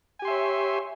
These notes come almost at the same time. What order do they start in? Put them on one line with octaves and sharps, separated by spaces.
G#5 G4 C6 E5 C#5